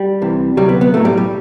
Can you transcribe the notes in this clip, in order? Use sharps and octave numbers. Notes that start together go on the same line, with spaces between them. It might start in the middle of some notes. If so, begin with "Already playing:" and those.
Already playing: G3
C2 C3 E3
D2 C3 F#3 G3
B3
B3
B1 A2 F#3 A3
G3
G3